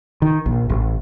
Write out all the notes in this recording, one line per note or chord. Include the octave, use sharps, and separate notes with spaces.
D#3
A#1
A1